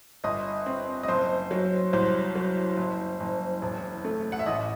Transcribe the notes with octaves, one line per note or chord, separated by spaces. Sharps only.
G1 D#5
C4
D#5
F#1 C5
F#3
C2 C5
F#3
F#1
F#1
E1
A3
F#5
E5
A1 D#5